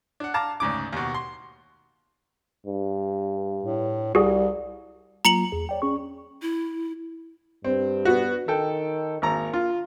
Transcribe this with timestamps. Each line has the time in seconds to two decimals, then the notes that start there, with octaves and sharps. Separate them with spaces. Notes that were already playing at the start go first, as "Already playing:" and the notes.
0.20 D4 F#5
0.34 F5 A5 A#5 D6
0.60 D2 G#2 C#3 D6
0.93 D#2 B2
1.14 C6
2.67 G2
3.63 A2
4.15 C2 G3 F#4 G#4
5.25 F#3 A#3 F4 A#5 C#7 F#7
5.52 E2 G#4
5.69 C#5 D5 G5
5.82 C#4 G#4 C#6
6.42 E4
7.64 G2 C4
8.05 B3 F#4
8.48 D#3 A4 G5
9.22 G#1 A#3 A#5
9.53 F4